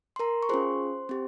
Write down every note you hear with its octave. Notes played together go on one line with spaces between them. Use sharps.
C6
A#4 A#5
C#6
C#4 F4 G#4 C5 C6
C4 G4